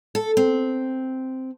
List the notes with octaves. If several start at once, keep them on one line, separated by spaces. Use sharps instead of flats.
A4
C4